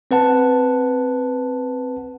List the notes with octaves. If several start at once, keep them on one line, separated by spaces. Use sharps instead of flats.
C4 B4 F#5 A5